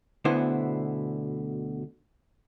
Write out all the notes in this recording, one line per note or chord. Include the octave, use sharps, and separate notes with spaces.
D2 B2 D3 B3 E4 C5